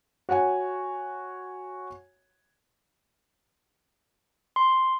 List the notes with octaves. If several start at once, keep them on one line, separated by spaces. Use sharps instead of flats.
F#4 C#5 F#5 G#5
C6